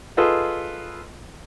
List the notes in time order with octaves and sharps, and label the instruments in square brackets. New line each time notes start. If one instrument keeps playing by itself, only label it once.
[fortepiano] F4 G#4 A4 B4 D#5